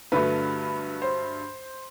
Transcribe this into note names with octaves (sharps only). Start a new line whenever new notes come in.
G2 D3 F#3 A3 B4
C5